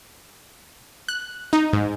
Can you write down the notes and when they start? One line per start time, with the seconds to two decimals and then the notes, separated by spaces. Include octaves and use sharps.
1.08 F#6
1.53 D#4
1.73 G#2